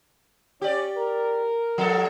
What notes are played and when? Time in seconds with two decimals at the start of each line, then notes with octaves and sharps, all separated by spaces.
0.62 C#4 G4 D5
0.97 A#4
1.78 F3 A4